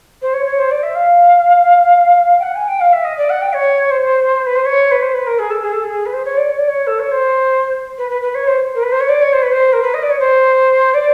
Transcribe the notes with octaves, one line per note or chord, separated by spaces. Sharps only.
C5
C#5
C#5
C5
D5
E5
F5
G5
F#5
G#5
G5
F5
E5
D#5
D5
F#5
G5
C#5
C5
B4
C5
C#5
B4
C5
B4
A#4
G#4
A4
G#4
A4
G#4
B4
C5
C#5
D5
C#5
D5
C#5
A4
C#5
C5
B4
B4
B4
C#5
C5
A#4
B4
C5
C#5
D5
C#5
C5
B4
C5
A#4
B4
D#5
D5
C#5
C5
D5